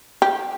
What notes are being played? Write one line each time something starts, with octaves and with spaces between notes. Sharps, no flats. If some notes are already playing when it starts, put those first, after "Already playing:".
G4